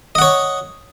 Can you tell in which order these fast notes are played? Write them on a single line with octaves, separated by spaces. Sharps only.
D#5 F#5 C#5